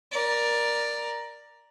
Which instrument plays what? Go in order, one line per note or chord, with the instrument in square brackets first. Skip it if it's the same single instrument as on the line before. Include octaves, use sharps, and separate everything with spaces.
[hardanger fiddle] A#4 D5